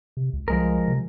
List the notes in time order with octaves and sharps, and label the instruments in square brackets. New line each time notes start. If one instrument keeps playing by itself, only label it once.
[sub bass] C3
C#2
[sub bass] C2 [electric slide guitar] F3 G#3 A#4
[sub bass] C3